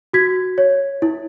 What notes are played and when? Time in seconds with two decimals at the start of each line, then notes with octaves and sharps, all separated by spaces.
0.14 F#4 G#6 B6
0.58 C#5
1.02 E4